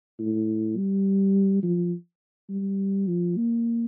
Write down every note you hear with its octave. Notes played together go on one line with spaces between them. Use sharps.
A2
G3
F3
G3
F3
A#3